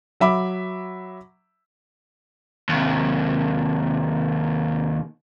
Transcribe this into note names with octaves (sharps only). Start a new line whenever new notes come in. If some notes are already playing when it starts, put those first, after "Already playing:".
F#3 E5 B5 D6
D#2 C3